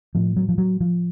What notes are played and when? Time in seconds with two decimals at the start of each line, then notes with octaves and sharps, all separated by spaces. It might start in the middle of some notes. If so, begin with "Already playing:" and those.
0.15 A2 F3
0.36 F#3
0.49 F3
0.58 F#3
0.80 F3